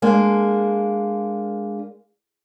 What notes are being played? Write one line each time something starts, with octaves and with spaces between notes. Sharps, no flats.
G#3 A#3 D4